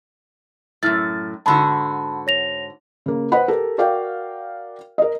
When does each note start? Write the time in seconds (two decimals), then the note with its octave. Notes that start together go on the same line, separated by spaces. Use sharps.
0.83 F#2 A2 F6 A6
1.46 G#2 D3 F#4 A5 B5 C6
2.27 C#5 A#6 F7
3.06 C#3 A#3
3.32 B4 C5 D#5 F#5 B5
3.48 G4 A4 A#4
3.78 F#4 A#4 D5 F5 G5
4.98 A#4 D#5